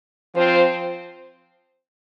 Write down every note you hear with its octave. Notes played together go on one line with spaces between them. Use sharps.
F3 C4 F4 C5